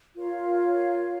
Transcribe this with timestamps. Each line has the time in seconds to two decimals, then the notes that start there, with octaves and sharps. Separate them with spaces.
0.15 F4 A#4 C#5 F5